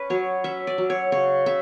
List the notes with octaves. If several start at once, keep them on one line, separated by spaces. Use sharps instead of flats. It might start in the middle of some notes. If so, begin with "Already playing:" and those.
Already playing: C#4 B4
F#3 C#5
C#4 E5
D5
F#3
C#5
C#3 C#5
C#3 E5